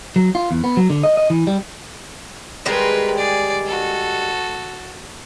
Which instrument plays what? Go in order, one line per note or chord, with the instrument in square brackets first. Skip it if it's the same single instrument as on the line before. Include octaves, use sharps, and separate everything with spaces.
[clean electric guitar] F#3
F4
E2
B3
F#3
D3
D#5
D#5
E3
G3
[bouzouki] D#3 G3 G#3 [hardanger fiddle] A#4 B4
[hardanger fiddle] G#4 D5
F#4 A4